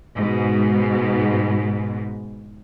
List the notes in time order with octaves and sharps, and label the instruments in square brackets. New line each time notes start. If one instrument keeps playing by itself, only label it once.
[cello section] G#2 B2